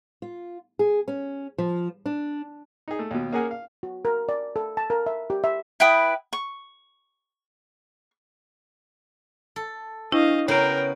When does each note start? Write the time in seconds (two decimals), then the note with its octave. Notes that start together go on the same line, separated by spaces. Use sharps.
0.22 F4
0.79 G#4
1.08 C#4
1.58 F3
2.06 D4
2.88 D#4 G#4
2.99 A3
3.11 D#2 B2
3.32 A#3 C#4 G#4 A#4 F#5 G#5
3.51 F5
3.83 F#4
4.05 A#4
4.29 D5
4.56 A4
4.77 A5
4.90 A#4
5.06 E5
5.30 G4
5.44 E5
5.80 E4 B4 G5 D#6
6.33 C#6
9.56 A4
10.12 D4 E4 D#5 F5
10.48 C#3 B3 F#4 A#4 C#5 G5 A#5 D7